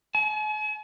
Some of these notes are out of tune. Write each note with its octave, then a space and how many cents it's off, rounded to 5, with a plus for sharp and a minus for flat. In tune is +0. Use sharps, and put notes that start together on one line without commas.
G#5 +45